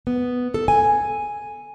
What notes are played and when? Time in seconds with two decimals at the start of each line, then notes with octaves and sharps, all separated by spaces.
0.07 B3
0.54 A4
0.68 G#5